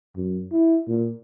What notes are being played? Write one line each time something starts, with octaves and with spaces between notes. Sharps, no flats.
F#2
E4
A#2